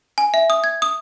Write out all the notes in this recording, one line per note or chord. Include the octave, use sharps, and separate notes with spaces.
G#5
E5
D#6
G#6
D#6